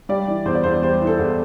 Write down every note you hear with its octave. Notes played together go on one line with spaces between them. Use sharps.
G3 D5
E3
E2 C5
D5
E2 C5
G3 C5
E3
A4
E2